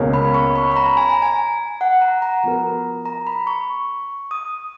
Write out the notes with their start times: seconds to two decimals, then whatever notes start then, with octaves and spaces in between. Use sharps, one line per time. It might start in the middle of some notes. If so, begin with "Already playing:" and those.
Already playing: C#2 B2 A#3 C#4 G#4
0.14 B5
0.34 C#6
0.56 B5
0.72 B5
0.76 A#5
0.97 G#5
1.09 A#5
1.22 G#5
1.81 F#5
2.01 A#5
2.22 A#5
2.43 F3 B3 F#4 A#4
3.06 A#5
3.27 B5
3.47 C#6
4.31 D#6